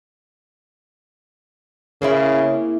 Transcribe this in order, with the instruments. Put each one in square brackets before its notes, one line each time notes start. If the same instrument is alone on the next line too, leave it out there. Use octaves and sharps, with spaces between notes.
[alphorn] C#3 [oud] A#3 C4 E4